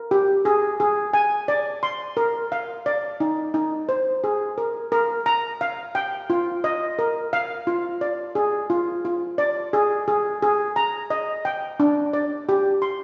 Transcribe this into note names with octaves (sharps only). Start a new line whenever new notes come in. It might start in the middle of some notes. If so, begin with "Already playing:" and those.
Already playing: A#4
G4
G#4
G#4
G#5
D5
C6
A#4
F5
D5
D#4
D#4
C5
G#4
A#4
A#4
A#5
F5
G5
F4
D#5
A#4
F5
F4
D5
G#4
F4
F4
D5
G#4
G#4
G#4
A#5
D#5
G5
D4
D5
G4
C6